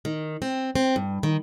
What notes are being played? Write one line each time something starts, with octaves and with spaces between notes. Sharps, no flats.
D#3
C4
C4
G2
D#3